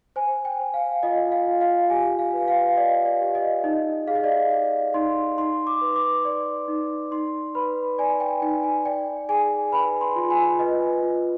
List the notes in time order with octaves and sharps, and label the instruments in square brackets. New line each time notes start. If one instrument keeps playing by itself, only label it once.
[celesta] C5 G#5
G5
C5
F5
F4 D#5
F5
F4
F5
G4 G#5
F5
B4
F5
D5 D#5
D5
G4
D#5
D#4 D#5
G#4 F5
D#5
D5
D#5
D5
D#4 C6
D#4 C6
D6
B4
D6
D5
D#4
D#4 C6
B4 B5
D5 G#5
G5
D#4 G5
G#5
D5 G5
G#4 G#5
B4 B5
C6
F4
G#5
B4 D#5
F4